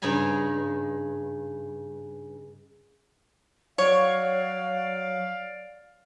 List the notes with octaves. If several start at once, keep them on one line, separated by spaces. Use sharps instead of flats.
G2 C#3 D#4 G#5 B5
F#3 C#5 D5 F5